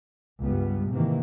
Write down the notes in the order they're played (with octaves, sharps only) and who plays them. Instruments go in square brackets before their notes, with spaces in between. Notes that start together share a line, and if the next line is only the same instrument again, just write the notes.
[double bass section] C#2 G2 G3 B3
G#2 C3 D#3 E3 A#3